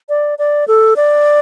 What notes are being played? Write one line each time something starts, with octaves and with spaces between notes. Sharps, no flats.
D5
D5
A4
D5